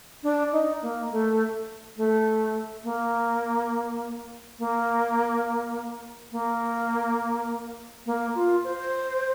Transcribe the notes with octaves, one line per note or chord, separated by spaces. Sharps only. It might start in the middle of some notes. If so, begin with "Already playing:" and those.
D4
D#4
A#3
A3
A3
A#3
A#3
A#3
A#3
F4
C5